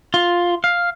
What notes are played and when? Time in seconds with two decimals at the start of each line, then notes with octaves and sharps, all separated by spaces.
0.14 F4
0.64 F5